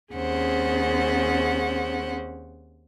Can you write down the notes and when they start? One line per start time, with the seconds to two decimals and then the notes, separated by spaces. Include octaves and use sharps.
0.12 D#2 C4 C#4 G#4 C5 F#5